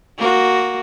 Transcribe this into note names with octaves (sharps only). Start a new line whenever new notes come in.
A#3 F#4